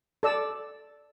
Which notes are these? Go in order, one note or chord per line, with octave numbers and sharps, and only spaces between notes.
A4 D5 E6